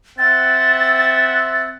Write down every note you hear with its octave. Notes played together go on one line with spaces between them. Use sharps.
C4 E5 F#5 A6